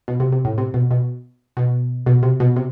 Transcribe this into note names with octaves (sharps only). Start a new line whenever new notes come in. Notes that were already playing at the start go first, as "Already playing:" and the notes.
B2
C3
C3
A2
C3
B2
B2
B2
B2
C3
B2
C3